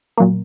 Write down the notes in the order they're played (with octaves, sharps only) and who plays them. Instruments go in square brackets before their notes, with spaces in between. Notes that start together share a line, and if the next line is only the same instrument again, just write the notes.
[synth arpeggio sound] A#2 F#3 A#3